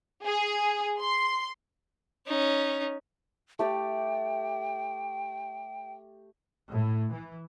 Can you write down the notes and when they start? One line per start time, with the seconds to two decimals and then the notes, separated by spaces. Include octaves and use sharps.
0.24 G#4
1.00 C6
2.27 C#4 D#4
3.59 A3 G4 D5 G5
6.71 A2
7.13 E3